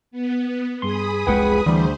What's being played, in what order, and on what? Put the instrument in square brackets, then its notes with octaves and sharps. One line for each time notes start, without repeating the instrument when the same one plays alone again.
[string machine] B3
[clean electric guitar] G2 C6 [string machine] G#4 B5 D#6
[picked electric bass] F1 C2 G#3 [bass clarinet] B4 [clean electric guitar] F#5 G5
[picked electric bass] D2 [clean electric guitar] E3 [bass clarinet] G3 [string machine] C5